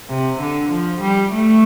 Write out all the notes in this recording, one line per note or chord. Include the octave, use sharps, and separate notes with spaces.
C3
D3
F3
G3
A3